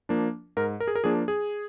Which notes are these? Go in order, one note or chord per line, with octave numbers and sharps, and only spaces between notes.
F3 A#3 D4
G#2 A#4
A#4
G#4
A#4
F3 A#3 D4 G#4
G#4